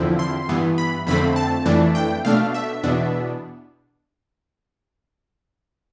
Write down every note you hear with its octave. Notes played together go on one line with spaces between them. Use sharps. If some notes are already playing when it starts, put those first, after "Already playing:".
Already playing: E2 D3 F3 C4 E4
C6
G2 E3 B3
B5
F2 D3 A3 C4 B5
A5
F2 E3 A3 D4
G5
B2 A3 D4 F5
E5
E2 B2 B3 D4